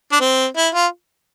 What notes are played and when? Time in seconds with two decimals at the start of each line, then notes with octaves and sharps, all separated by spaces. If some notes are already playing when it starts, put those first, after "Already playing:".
0.12 D4
0.21 C4
0.57 E4
0.74 F4